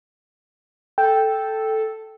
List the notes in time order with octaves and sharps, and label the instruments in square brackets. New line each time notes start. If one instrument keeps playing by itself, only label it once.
[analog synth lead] A4 [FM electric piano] G5